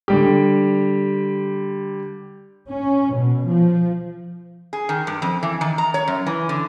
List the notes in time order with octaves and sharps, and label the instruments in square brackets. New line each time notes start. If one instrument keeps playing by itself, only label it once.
[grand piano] D3 G3 G4
[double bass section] C#4
B2
F3
[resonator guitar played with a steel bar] G#4
D#3
G2
F2
E3
D#3
A#5
C#5
F#2
E3
D3